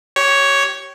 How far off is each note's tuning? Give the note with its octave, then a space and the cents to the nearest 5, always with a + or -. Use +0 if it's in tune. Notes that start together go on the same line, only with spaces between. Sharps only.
G4 -30 C#5 +0